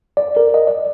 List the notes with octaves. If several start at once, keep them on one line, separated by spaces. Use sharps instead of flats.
D5
A#4
D#5
D5